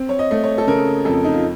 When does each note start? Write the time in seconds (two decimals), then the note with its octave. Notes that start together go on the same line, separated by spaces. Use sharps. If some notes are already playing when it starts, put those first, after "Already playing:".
Already playing: C4
0.09 C#5
0.19 D#5
0.31 A3
0.44 C#5
0.58 A4
0.67 C#3 A#4
1.05 F2 A4
1.25 D#4
1.34 F4